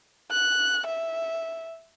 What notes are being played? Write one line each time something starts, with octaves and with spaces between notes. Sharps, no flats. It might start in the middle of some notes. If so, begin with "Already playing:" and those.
F#6
E5